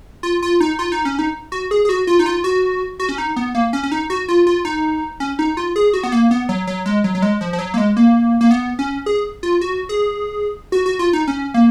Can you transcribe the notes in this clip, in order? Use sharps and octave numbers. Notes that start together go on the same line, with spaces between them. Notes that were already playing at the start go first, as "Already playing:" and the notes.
F4
F4
D#4
F4
D#4
C#4
D#4
F#4
G#4
G#4
F#4
F4
D#4
F4
F#4
F#4
C#4
D#4
B3
A#3
C#4
C#4
D#4
F#4
F4
F4
D#4
C#4
D#4
F4
G#4
F#4
B3
A#3
B3
F#3
F#3
G#3
F#3
F#3
G#3
F3
F3
F#3
A#3
G#3
A#3
A#3
B3
C#4
G#4
F4
F#4
G#4
F#4
F#4
F4
D#4
C#4
A#3